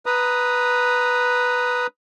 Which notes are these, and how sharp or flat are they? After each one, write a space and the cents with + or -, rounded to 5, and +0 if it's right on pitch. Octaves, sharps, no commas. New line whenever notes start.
B4 +0 A#5 +0 D#6 +0